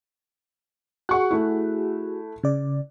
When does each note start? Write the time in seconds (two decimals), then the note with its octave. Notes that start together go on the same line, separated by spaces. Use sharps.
1.09 F#4 G#4 F#5 C#6 F#6
1.31 A3 E4
2.43 C#3 D5